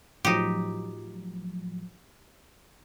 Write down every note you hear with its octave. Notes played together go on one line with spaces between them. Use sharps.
A2 F3 F#3 D#4 G4